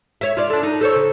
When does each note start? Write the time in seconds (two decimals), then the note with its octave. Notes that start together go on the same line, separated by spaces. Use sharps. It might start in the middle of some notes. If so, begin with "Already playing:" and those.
0.21 C#5 E5
0.37 F4 D5
0.50 D4 A4
0.63 D#4
0.81 A4 C5 C#5
0.95 C#3